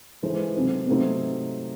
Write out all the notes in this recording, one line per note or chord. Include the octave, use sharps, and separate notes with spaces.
E3 G#3 D#4 A4 C5
C3 F#3 C4 D#4 A4
C3 F#3 A3 C4 D#4